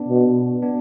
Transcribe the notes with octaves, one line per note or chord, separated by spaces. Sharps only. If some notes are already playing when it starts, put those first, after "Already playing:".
Already playing: B3 D4
B2
B3 D4